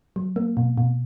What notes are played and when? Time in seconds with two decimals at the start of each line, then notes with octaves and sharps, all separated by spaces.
0.16 F#3
0.36 A#3
0.57 B2
0.78 B2